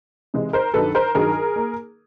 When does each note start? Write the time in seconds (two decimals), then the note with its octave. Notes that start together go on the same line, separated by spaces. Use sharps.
0.34 C3 E3 G#3
0.53 A#4 C5
0.74 G2 D#3 F#3 A4 B4
0.95 A#4 C5
1.15 G2 D#3 F#3 G#4 A#4
1.56 A#3